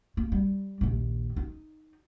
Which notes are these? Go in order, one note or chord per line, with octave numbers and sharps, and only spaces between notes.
A#3
G3
A#1 D#2
D#4